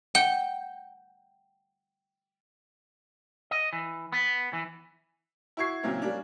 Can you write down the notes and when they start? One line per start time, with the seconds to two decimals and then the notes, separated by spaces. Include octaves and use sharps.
0.15 F#5 G5
3.51 D#5
3.73 E3
4.12 B3
4.53 E3
5.57 E4 F#4 C#6 G#6 C7
5.83 A#2 C#3 F#3 A#3 C4 E4
6.02 G3 A#3 C#4 D4